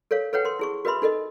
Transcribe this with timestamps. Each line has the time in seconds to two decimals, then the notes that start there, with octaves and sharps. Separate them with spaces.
0.11 A4 A#4 C#5 F5
0.33 A4 B4 C#5 F#5 G5
0.45 A#4 C6
0.59 E4 G#4 C#6
0.85 F#4 A#4 B4 E5 B5 C6
1.02 D#4 A4 A#4 D#5